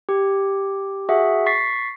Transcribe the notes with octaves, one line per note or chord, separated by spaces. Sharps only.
G4
F#4 G#4 E5 F#5
C#6 A6 B6 C7